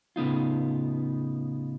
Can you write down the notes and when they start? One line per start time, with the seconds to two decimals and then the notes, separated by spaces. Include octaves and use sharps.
0.16 A2 C#3 B3 D#4 F4